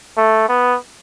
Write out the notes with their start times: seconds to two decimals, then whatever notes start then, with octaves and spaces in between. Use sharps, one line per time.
0.17 A3
0.49 B3